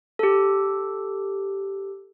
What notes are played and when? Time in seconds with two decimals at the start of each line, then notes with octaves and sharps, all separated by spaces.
0.19 G4 A4